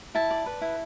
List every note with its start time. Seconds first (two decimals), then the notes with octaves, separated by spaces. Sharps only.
0.15 E4 A5
0.30 D5
0.46 B4
0.61 E4